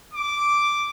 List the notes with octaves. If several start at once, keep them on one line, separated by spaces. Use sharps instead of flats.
D6